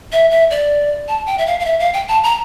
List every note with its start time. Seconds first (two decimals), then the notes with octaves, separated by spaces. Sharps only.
0.12 E5
0.31 E5
0.50 D5
1.08 A5
1.27 G5
1.38 E5
1.46 F5
1.60 F5
1.65 E5
1.80 F5
1.94 G5
2.08 A5
2.24 A#5